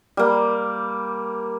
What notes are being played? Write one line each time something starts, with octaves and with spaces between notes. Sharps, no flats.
G3 A#3